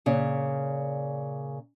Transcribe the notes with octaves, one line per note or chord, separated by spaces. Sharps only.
A#2 C#3 C#4